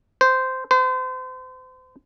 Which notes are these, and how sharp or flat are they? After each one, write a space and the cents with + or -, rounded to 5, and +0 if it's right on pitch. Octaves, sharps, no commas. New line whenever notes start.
C5 -10
C5 -35